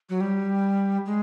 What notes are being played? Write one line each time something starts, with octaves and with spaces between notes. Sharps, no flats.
F#3
G3
G#3